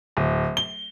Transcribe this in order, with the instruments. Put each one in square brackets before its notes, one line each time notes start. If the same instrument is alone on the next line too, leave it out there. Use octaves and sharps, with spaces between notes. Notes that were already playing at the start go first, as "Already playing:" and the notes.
[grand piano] D1
G7